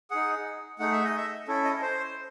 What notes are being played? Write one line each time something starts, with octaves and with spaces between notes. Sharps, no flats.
D#4 G#4 F#5
A3 D#4 G#4 F#5
E5
D#5
E5
C#4 E4 A4
D#5
C5